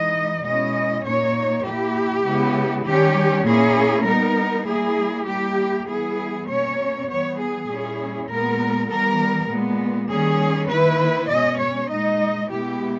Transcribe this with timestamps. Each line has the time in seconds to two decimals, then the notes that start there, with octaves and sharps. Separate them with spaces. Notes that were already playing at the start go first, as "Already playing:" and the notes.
Already playing: E3 G#3 D#4 D#5
0.44 B2 G#3 C#4 E4 D#5
1.04 A#2 A#3 D#4 C#5
1.64 A#2 A#3 E4 G4
2.25 C#3 G#3 B3 E4
2.85 D#3 G3 C#4 G4
3.46 A#2 A#3 C#4 E4 G#4
4.06 G3 B3 D#4 A#4
4.66 G3 A#3 E4 G#4
5.26 G3 A#3 E4 G4
5.86 E3 G3 B3 E4 G#4
6.47 B2 A#3 C#4 C#5
7.08 E3 G3 B3 C#5
7.38 G#4
7.68 A#2 G3 C#4 E4
8.29 A#2 G#3 B3 A#4
8.89 E3 G3 B3 A#4
9.49 A#2 G#3 B3
10.09 D#3 G3 A#3 C#4 G#4
10.69 D#3 A#3 E4 B4
11.30 B2 G#3 C#4 D#5
11.60 C#5
11.90 A#2 G#3 D#4 D#5
12.51 B2 G#3 B3 E4 G4